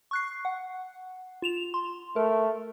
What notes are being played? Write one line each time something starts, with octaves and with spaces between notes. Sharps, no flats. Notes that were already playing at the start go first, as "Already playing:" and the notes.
C#6 F#6 C7
F#5
F4 E7 F7
C6
A3 A#4